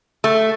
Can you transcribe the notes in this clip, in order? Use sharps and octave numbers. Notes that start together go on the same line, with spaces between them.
A3